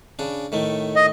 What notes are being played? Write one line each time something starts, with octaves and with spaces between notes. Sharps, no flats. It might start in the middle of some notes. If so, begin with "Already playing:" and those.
C#3 D4
A2 D#3 A3
D#5